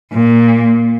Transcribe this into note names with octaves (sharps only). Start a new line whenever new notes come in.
A#2